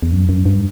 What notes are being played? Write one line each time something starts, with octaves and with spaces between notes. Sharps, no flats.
E2
F#2
F#2
G2